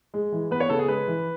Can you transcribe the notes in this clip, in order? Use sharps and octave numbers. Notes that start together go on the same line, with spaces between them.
G#3
E3
B3 B4
C#5
C#3 A4
G#4
G#3 B4
E3